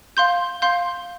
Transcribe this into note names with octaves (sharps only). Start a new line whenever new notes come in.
F5 C6 G6
F5 C6 G6